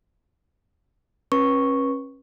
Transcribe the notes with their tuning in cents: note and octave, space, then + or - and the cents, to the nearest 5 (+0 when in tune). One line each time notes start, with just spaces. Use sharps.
C#4 -30 B4 -30 C#6 -5